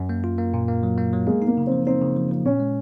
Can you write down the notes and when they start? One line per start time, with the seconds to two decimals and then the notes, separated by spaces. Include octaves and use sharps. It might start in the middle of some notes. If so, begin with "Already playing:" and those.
Already playing: F#2
0.09 A#3
0.24 F4
0.38 A#3
0.54 A#2
0.68 A#3
0.83 F#3
0.98 A#3
1.13 F#3
1.27 G#3 A#3
1.42 D#4
1.47 A#3
1.57 C#3
1.67 F3 C4
1.87 C4 D#4
2.01 C#3
2.16 F3
2.31 F3
2.45 A#2 C#4
2.60 G#3